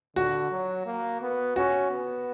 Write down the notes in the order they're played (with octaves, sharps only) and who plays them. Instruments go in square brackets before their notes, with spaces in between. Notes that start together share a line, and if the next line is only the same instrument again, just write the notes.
[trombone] D3 [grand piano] F#4
[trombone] F#3
A#3
B3
[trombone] C#4 [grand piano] F#4
[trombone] B3